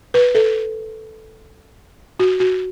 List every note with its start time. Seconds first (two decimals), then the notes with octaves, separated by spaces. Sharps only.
0.14 B4
0.35 A4
2.20 F#4
2.40 F#4